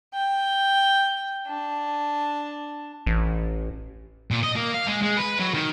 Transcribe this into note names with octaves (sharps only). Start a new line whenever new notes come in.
G5
D4
A1
A#2
D#5
A#3
F5
G#3
G#3
B4
F#3
D#3